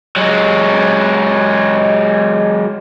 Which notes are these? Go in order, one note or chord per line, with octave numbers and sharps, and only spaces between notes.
F#3 G#3